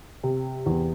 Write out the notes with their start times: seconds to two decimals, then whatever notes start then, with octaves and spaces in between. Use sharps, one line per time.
0.23 C3
0.66 E2